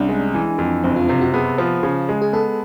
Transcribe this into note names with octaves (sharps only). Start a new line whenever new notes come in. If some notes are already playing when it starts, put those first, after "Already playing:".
Already playing: C2 C#4 D4
G#3
E3
F2
F#1 C4
F4
C3 F4
F#4
B3 G#4
F3
C#3
G#3
G#4
B3 A4